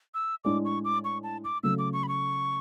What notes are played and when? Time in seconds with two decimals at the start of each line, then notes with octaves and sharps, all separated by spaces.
0.14 E6
0.44 A2 G#3 D4 D6
0.65 C#6
0.85 D6
1.04 C#6
1.23 A5
1.44 D6
1.63 C#3 F#3 A3 E6
1.79 D6
1.93 C#6
2.03 B5
2.08 C#6